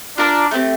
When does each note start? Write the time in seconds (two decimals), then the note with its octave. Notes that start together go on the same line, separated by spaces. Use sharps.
0.18 D4 F4 A#4 D5
0.51 A3 C4 G4